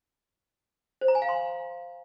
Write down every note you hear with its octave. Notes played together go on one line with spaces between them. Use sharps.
C5
A#5
G#5
F5
C6